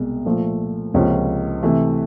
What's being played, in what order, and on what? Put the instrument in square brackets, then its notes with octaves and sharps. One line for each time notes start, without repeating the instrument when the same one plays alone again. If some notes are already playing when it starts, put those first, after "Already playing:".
Already playing: [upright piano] C2 B2 G#3
A#2 F3 A3
C#2 C3 F3 A#3 C#4
C3 E3 A3